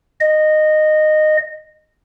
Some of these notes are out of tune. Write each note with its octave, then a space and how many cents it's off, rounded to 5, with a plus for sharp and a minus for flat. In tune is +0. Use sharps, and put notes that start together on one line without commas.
D#5 -15